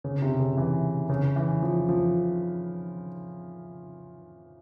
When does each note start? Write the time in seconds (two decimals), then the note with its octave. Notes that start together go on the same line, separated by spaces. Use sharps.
0.04 C#3
0.22 C3
0.39 C#3
0.57 E3
1.09 C#3
1.36 E3
1.62 F3
1.89 F3